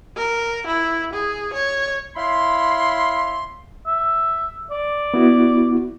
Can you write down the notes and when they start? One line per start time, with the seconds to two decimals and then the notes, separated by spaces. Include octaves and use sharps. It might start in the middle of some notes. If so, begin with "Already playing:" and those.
0.16 A#4
0.67 E4
1.14 G#4
1.54 C#5
2.16 E4 C#5 F5 B5 C6
3.87 E5
4.71 D5
5.14 B3 E4 F#4